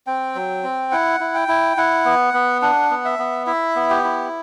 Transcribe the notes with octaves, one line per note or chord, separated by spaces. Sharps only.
C4 G5
F#3
C4
E4 F#5
E4
G5
E4
E4 F#5
B3
B3
D4 F#5
B3
E5
B3
E4 E5
B3
G4
E4